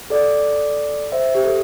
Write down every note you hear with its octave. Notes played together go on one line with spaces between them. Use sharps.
A4 D5
C5 E5
G4
A4